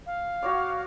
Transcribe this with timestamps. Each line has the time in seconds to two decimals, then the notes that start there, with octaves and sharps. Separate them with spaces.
0.07 F5
0.43 F#4 C#5 D5